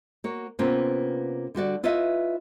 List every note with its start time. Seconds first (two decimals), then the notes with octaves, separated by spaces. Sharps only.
0.24 A#3 F#4 C#5
0.59 C3 A#3 B3 C#4 F4 B4
1.55 D3 G3 F#4 D5
1.83 E4 F4 B4 C#5 D#5 E5